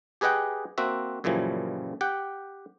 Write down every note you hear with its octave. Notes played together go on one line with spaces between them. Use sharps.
G4 G#4 B4 D#5 F#5 G5
A#3 C4 F#4 E5
F#2 A#2 C#3 E3 F3 G3
G4 F#5 G5